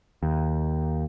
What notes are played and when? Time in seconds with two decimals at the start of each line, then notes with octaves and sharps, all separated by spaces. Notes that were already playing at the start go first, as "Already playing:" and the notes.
0.23 D#2